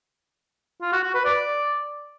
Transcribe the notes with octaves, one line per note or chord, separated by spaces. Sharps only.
F4
F#4
F#4
B4
D5